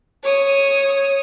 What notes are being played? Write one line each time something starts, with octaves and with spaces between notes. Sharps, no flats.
C#5 D#6